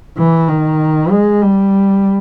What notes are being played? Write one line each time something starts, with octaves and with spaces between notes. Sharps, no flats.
E3
D#3
G#3
G3